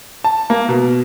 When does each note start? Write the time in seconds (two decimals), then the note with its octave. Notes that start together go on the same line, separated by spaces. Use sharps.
0.24 A5
0.50 A#3
0.69 B2